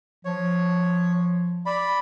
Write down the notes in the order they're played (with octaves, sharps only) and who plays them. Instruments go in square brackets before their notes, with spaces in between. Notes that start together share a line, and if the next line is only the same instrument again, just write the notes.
[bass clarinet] F3 [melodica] C#5
[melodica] D5 B5